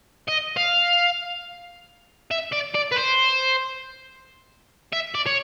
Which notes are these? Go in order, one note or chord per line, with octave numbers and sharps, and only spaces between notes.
D#5
F5
E5
D5
D5
B4
C5
E5
D5
C#5